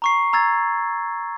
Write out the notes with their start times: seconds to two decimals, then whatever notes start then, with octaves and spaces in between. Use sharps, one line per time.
0.02 A#5 C#6 C7
0.33 A#5 E6 G#6 A6